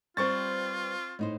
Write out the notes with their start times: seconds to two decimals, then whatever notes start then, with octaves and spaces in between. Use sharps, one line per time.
0.17 G3 C4 F4 B4 C5 C#6 A6
1.19 A2 D#4 C5